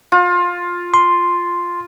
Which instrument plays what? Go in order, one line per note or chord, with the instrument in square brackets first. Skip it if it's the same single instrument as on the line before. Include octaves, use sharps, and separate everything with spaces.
[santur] F4
[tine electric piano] C6